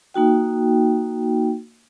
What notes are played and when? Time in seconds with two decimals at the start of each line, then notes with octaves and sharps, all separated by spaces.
0.14 A#3 D#4 F#4 G5